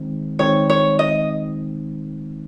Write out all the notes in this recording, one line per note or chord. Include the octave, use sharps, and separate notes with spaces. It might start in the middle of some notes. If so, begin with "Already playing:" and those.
Already playing: D#3 G#3 C4 D#4
D#3 G#3 C4 D#4 C#5
C#5
D#5